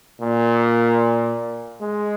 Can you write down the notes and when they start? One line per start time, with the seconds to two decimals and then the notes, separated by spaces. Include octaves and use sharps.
0.21 A#2
1.81 G#3